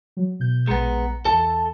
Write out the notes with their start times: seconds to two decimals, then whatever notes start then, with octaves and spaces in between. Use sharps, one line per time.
0.17 F#3
0.40 B2 G6
0.67 A#1 G#3 B3 A#5 C#7
1.25 E2 A4 A5